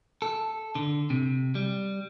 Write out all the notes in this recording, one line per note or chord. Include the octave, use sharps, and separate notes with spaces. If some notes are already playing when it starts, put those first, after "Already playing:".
A4
D3
C3
G3